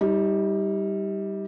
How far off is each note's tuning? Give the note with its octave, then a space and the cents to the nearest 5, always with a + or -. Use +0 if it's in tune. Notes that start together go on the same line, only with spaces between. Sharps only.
G3 +0 D#4 +40